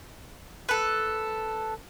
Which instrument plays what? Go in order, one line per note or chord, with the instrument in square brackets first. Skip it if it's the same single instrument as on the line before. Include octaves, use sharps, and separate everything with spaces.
[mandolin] A4 B4